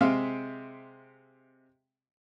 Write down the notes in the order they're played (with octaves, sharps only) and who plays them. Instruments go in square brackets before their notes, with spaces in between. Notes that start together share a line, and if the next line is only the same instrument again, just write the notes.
[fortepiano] C3 G#3 C4 E5 F5